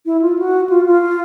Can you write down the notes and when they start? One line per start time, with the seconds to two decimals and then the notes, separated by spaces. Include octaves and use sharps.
0.06 E4
0.22 F4
0.39 F#4
0.69 F4
0.86 F4